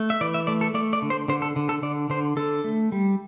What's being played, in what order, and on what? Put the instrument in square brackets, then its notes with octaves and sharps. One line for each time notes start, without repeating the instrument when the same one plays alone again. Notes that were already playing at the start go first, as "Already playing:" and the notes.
Already playing: [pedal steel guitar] A3
E5
E3 D5
E5
A3 D5
A4
A3 D5
D5
D3
C5
D3 C5
A4
D3
A4
D3 D5
D3 C5
D3 A4
A3
G3